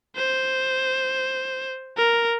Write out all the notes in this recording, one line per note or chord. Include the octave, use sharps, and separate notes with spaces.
C5
A#4